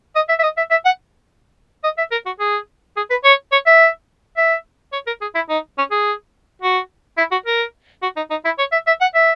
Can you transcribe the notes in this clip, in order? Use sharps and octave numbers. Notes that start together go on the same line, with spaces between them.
D#5
E5
E5
D#5
E5
E5
F#5
D#5
E5
A#4
F#4
G#4
G#4
B4
C#5
C#5
E5
E5
C#5
A#4
G#4
E4
D#4
C#4
G#4
F#4
E4
F#4
A#4
F#4
D#4
D#4
E4
C#5
E5
E5
F#5
E5